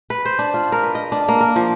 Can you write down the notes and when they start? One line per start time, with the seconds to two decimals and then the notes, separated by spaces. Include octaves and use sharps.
0.10 B4
0.25 C5
0.39 D4
0.54 F4
0.72 A#4
0.83 B4
0.95 D#5
1.12 D4
1.28 A#3
1.41 A#4
1.56 F3